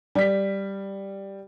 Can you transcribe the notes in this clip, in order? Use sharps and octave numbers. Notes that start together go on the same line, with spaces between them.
G3 B6